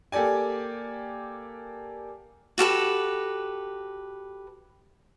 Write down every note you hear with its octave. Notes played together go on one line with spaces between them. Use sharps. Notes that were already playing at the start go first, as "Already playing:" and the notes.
A#3 G4 A4 D5 G#5
F#4 G4 A4 B4